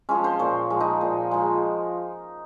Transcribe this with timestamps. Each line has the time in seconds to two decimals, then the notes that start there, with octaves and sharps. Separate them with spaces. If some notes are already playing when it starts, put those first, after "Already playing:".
0.09 F3 G#3 C#4
0.24 C5
0.39 A#2 C#5
0.70 F3 G#3
0.80 D#4
1.01 A#2
1.31 F3 G#3